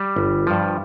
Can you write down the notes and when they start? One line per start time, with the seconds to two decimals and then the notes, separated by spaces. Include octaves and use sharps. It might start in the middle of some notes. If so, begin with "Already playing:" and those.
Already playing: G3
0.16 G1
0.47 G2 F3